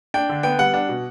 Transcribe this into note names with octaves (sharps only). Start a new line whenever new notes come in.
D4 G5
D3
B3 G5
G3 F#5
D4 F#5
B2